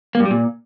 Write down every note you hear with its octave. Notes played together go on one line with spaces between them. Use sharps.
A#3
G2
G3
A#2